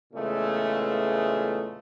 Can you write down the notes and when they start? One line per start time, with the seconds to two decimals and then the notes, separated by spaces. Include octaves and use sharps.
0.13 E2 A#2 C#3 G#3 A3